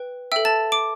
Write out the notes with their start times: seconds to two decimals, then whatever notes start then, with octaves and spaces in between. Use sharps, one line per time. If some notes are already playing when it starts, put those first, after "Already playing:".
Already playing: B4 G5
0.32 A4 E5 G5 E6
0.45 A5 A6
0.72 D6 D7